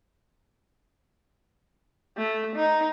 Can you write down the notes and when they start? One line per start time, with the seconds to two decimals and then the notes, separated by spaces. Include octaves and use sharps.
2.17 A3
2.55 D#4